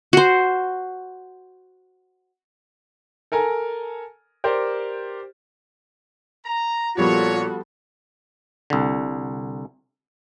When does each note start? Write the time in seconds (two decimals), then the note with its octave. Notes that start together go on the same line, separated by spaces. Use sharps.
0.13 F#4 C5
3.32 A4 A#4 G#5 A#5
4.44 G4 A#4 C5 D5
6.46 A#5
6.98 A#2 F3 G3 B3 F#4 A4 C#5
8.70 C2 D3